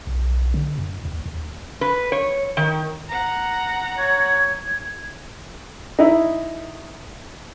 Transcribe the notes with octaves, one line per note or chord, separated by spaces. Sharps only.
B1
D3
F#2
D#2
D#2
B4
C#5
D#3
F#5 A#5
C#5 G#6
D#4 E4